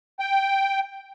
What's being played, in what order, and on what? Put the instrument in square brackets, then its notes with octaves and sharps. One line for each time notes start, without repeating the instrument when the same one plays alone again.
[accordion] G5